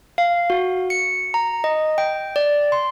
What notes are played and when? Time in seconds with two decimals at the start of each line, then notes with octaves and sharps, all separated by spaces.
0.18 F5
0.50 F#4
0.90 C#7
1.34 A#5
1.64 D#5
1.98 G5
2.36 D5
2.72 C6